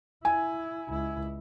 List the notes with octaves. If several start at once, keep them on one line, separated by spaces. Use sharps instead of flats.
E4 G#5
C#2 E4